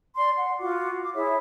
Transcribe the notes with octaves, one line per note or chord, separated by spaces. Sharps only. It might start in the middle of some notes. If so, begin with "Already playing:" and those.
D5 C6
F#5
F4 F#4 D6
D6
E4 G#4 C#5 E5